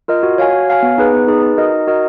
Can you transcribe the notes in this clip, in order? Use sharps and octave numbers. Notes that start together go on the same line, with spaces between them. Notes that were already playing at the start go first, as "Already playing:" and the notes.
F4 A#4 D#5
F#4
C#5 F5 G#5
F#4
C#5 F5 G#5
B3
D#4 G#4 B4
B3
D#4 G#4 B4
D#4
F#4 A#4 D#5
D#4
F#4 A#4 D#5